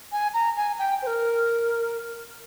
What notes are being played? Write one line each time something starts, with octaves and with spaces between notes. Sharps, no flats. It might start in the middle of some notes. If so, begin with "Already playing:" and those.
G#5
A#5
G#5
G5
C5
A#4